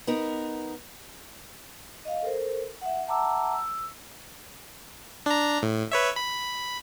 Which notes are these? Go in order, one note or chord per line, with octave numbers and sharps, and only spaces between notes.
B3 D#4 A#4
D#5 F5
A4 A#4 C5
E5 F#5
E5 F#5 A5 A#5 D6 E6
E6
D4 A#5
A2
B4 C#5 E5
B5